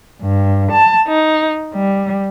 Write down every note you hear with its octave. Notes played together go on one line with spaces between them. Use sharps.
G2
A5
D#4
G3